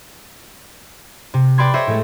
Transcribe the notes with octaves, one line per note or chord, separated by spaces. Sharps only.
C3
B4 D5 G5 B5 C6 G#6
C5 C#5 D#5 E5 C6
A2 G#3 A3